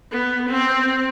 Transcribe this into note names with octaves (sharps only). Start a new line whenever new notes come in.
B3
C4